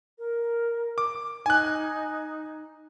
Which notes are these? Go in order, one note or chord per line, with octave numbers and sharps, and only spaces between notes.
A#4
D6
D#4 G#5 F#6